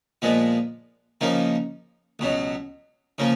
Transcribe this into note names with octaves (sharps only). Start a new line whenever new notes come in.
A#2 F3 G#3 B3
C#3 F3 A#3 D#4
C#2 B2 F#3
C#3 F3 A#3